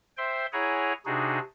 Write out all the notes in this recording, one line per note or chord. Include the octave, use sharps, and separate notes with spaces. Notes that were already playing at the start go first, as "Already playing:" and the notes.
C5 E5 G5 C6
E4 G#4 C#5 F#5 G#5 A#5
C3 D4 D#4 F#4 G#4